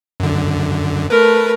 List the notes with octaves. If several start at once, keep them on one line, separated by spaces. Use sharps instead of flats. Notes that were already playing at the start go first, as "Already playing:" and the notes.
F#2 D3
A3 A#4 B4